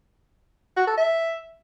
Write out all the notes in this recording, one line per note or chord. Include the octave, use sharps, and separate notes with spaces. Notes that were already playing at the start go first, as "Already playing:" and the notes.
F#4
A4
E5